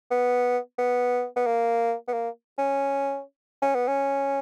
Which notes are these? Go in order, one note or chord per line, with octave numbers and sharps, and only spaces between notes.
B3
B3
B3
A#3
B3
A#3
C#4
C#4
B3
C#4